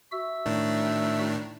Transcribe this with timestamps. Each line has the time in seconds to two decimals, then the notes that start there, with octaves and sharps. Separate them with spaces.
0.12 F#4 E5 E6
0.46 A2 D#3 D4